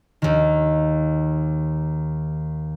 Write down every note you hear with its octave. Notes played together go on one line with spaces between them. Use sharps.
D#2 D#3